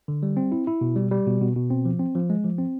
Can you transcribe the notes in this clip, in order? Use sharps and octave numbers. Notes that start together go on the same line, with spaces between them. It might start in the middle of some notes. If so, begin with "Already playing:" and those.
D3
G3
C4
E4
E4
B2
G3
G3
B2
B2
B2
C4
F3
C4
F3
G#3
F3
C4